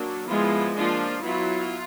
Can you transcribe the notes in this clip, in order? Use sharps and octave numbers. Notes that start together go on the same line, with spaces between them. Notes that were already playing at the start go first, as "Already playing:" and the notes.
Already playing: F#3 A#3 D4
F3 G#3 B3 E4 F4
F3 A#3 D4 F4
F#3 B3 E4 F4